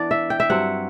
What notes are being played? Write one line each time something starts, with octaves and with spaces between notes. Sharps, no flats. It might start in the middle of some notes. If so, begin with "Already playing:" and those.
Already playing: E3 B3 D4 D5
E5
G5
E5
G2 F#3 C4 F#5